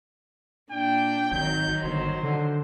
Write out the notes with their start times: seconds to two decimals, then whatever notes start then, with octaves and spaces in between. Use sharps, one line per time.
0.72 A#2 D4 G5
1.32 G#1 D#3 F#3 G6
1.84 G1 C5
2.23 D3